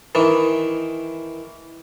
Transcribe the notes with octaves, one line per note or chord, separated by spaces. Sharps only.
D#3 E3